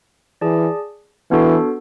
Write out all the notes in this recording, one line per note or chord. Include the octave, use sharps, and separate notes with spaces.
E3 G#4 D5 A5
E3 B3 D4 F#4 A4